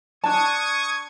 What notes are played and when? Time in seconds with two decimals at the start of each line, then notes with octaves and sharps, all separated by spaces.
0.24 D4 A5 C#6 D#6 G#6